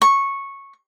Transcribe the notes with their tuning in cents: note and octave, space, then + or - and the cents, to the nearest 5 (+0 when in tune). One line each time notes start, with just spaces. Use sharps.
C#6 -10